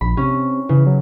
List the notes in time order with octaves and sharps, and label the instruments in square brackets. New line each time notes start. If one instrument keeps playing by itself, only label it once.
[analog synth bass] A#1 [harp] B5
[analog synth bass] C3 [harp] C#4
[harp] C#3 [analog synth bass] E3
[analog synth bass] F#3